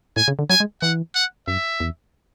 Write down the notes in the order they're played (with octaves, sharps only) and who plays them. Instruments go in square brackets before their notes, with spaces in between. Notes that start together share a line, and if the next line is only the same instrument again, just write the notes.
[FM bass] A2 [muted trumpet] G#5
[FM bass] C#3
D3
[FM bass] F#3 [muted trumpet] G#5
[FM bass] G#3
[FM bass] E3 [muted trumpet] F#5
[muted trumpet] F#5
[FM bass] F#2 [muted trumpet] E5
[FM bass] E2